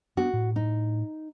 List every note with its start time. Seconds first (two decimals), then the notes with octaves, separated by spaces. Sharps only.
0.17 B3 D4 F#4
0.34 A2
0.56 D#4